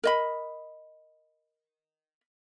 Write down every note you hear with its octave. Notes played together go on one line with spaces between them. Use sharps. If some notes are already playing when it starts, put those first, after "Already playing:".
A#4 D#5 B5